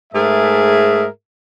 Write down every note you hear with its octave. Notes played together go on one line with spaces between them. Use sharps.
G#2 A3 G#4 A#4 E5